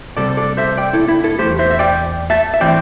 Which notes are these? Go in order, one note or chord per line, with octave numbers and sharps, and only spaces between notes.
C2 C3 G3 A4 D5
A4 D5
C5 E5
D5 G5
E4 A4
E4
E4 A4
E2 C3 A3 G4 C5
C5 E5
E5
D5 G5
E5 A5
E5
A2 E3 C4 D5 G5